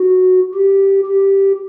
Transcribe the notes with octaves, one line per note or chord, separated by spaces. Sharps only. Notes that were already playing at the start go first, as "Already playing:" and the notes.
Already playing: F#4
G4
G4